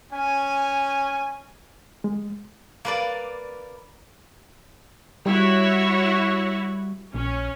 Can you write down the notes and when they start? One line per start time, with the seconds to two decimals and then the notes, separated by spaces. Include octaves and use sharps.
0.11 C#4 G#5
2.04 G#3
2.85 A#3 B4 D5
5.26 G3 E4 F#4 C#5
7.14 A#1 C#4